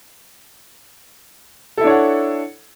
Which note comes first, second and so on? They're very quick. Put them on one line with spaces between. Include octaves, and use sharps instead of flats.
A4 E4 D4 C#5 F#5